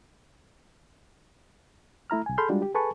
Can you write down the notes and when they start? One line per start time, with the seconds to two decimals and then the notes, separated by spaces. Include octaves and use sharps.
2.10 A3 E4 A#5 F6
2.26 C2 G#5
2.38 G#4 A4 B5 C6 F6 G6
2.49 G3 G#3 D4 F4 F#4
2.62 G4
2.74 G#4 A4 B4 G#5 A5 C#6